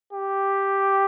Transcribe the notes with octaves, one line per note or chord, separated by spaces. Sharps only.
G4